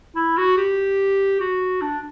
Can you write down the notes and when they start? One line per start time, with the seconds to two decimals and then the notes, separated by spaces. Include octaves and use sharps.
0.16 E4
0.37 F#4
0.57 G4
1.40 F#4
1.81 D4